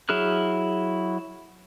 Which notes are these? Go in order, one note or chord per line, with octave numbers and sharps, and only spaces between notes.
F#3 E4 G#4 F6 F#6